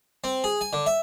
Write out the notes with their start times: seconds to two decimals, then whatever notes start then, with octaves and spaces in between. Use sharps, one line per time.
0.24 C4
0.44 G#4
0.61 G#5
0.73 D3
0.86 E5